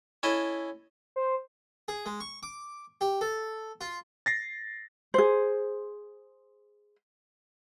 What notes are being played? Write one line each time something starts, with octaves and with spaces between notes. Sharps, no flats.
C#4 E4 A4 D#5
C5
G#4
G#3
C#6
D6
G4
A4
F4
A6 A#6 C7
G#4 C5